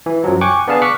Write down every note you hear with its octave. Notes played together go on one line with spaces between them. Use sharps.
E3
F#2 F3 F#3
G5 G#5 C#6 D6 F#6
B3 D4 G#4 F5 A5
C#6 D6 F6 F#6 B6 C#7